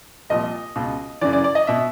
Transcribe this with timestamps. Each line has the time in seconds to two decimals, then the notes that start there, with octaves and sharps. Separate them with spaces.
0.30 C2 A#2 F3 D#5
0.76 C#2 B2
1.21 F#2 C#3 E3 D5
1.33 D5
1.44 D5
1.55 D#5
1.67 B2 E5